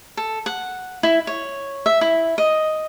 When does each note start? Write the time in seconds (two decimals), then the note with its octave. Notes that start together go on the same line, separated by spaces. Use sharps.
0.17 A4
0.46 F#5
1.03 E4
1.27 C#5
1.86 E5
2.01 E4
2.38 D#5